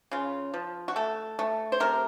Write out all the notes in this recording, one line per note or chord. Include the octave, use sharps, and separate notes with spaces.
C#3 F4
F3
F#4
A3 A4
A3
C5
C3 A#4